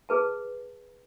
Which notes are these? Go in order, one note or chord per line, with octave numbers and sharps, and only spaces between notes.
G#4 B4 A5